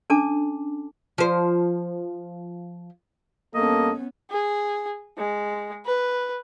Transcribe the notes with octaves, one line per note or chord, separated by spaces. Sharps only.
C#4 D4 A4 A5 D6
F3 C5
G2 A#3 B3 C#4 A4 D#5
G#4
G#3
B4